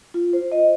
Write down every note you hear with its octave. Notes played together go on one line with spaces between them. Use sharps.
F4
C5
D#5